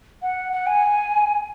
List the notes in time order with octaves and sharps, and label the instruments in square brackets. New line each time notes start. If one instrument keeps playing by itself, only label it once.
[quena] F#5
F#5
G#5